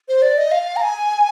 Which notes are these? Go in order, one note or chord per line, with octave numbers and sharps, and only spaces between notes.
C5
D5
D#5
F5
A#5
G#5